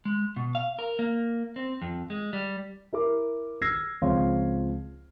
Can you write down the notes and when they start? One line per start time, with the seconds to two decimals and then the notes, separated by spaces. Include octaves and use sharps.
0.05 G#3
0.36 B2
0.55 F5
0.79 A#4
0.99 A#3
1.56 C4
1.82 F2
2.10 G#3
2.33 G3
2.93 E4 A#4 D6
3.62 E6 F6 G#6 A#6 C7
4.02 C#2 F3 C4 C#5 F5 C6